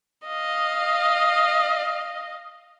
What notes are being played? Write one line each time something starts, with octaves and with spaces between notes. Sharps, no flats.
D#5 F5